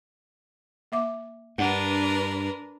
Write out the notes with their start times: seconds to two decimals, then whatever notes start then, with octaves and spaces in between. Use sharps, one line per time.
0.92 A#3 E5 D6
1.58 G2 D4 A#4 B4 F#5